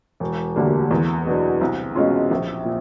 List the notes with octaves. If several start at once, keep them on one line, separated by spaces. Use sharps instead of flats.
E1
D2 D3 G3 A#3
E2
B2 F#3 B3 D4
C2
B2 G#3 C#4 F4
A#1
A#2